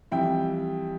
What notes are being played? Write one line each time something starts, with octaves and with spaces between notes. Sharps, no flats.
F2 E3 G3 E5 G5